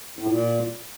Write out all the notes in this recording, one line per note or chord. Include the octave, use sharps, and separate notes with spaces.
A2
A#2